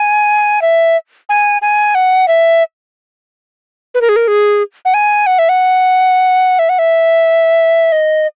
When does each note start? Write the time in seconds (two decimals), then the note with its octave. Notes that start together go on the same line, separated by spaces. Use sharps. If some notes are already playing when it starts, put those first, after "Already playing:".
Already playing: G#5
0.62 E5
1.29 G#5
1.62 G#5
1.95 F#5
2.28 E5
3.94 B4
4.01 A#4
4.09 G#4
4.16 A#4
4.28 G#4
4.85 F#5
4.94 G#5
5.26 F#5
5.39 E5
5.49 F#5
6.59 E5
6.69 F#5
6.79 E5
7.92 D#5